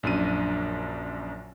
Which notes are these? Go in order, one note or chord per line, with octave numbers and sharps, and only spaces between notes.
A#1 F#2 D4 D#7